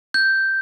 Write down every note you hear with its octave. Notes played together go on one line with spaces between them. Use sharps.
G6